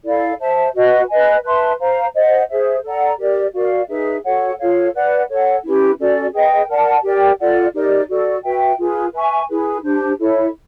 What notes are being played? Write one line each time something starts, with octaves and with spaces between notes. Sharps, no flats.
E4 A4 D5 F5
C5 E5 A5
F#4 B4 D#5 F#5
B4 D#5 G#5
B4 E5 A5 C6
C5 F5 A#5
C5 D#5 F#5
G#4 C5 E5
A4 D5 F#5 A#5
G4 A#4 D5
F#4 A#4 D5 F5
D#4 G#4 B4 E5
F#4 A4 C#5 F#5
F4 A4 C#5 F5
B4 D5 F#5
A4 C#5 F#5
C#4 E4 G4 B4
C#4 F#4 A4 D5
G#4 B4 D#5 G5
A#4 D5 F#5 A5
G4 A#4 D5 G5
F4 A4 D5 F#5
D#4 G4 A#4 D5
F#4 A4 D5
F#4 B4 E5 G5
F4 G#4 B4
B4 E5 G#5 C#6
E4 G#4 B4
D4 G4 C5
E4 A4 C#5 E5